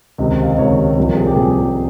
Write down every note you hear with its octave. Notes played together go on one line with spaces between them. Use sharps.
C#2 C3 D#3 D#5
F5
D#5
C#2 C3 D#3 C#5
C2 C3 F3 C#5
A#4
G#4
G4
C2 C3 F3 G#4